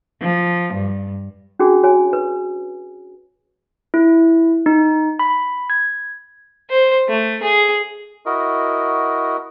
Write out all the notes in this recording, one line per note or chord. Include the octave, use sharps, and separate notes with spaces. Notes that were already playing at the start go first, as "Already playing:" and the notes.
F3
G2
C#4 D4 F#4 G#4 G#5
F#4 C#5 G#5
B4
E4
D#4
B5
G#6
C5
A3
G#4
E4 F#4 A#4 D#5